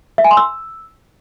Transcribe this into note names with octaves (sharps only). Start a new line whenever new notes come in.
E5
G#5
C6
E6